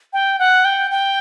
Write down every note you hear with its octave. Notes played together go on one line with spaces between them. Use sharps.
G5
F#5
G5
G5